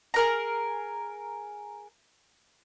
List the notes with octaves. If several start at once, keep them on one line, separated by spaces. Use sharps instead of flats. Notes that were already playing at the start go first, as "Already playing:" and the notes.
G#4 A#4 A#5